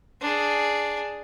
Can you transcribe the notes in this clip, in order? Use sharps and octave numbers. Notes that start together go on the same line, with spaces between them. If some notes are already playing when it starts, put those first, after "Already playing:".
D4 G#4